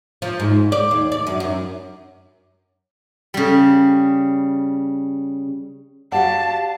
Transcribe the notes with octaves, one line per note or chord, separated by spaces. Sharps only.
F3
G#2
D5
D#2
D5
F#2
F#2
C#3 G3
F#4 G4 D5 F5 F#5 A5